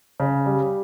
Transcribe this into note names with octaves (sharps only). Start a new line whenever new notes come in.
C#3
G3